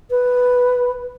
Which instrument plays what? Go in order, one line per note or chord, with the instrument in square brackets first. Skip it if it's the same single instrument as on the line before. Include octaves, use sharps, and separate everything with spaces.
[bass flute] B4